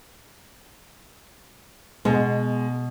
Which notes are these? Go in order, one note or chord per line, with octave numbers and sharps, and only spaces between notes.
B2 G#3